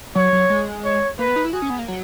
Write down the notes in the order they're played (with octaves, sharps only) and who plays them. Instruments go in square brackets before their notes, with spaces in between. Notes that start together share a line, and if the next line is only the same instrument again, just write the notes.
[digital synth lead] F#3 [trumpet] C#5
[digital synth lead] F#3
G#3
[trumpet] C#5
[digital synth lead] A#3 [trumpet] B4
[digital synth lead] B3
D#4
E4
[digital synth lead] F#4 [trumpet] G#4
[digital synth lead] C#4
B3
A#3
F#3